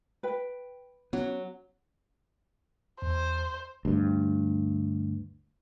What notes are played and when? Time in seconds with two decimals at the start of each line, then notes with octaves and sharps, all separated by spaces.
0.23 B4 G5
1.13 F#3 B3 C#4
3.02 E2 C5
3.85 D2 G2